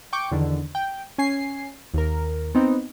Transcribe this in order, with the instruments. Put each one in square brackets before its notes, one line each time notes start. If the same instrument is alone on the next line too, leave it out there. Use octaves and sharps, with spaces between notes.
[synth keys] G5 C#6 D6
E2 D3 D#3
G5
C#4 G#5 C7
D#2 A#4
B3 C4 D#4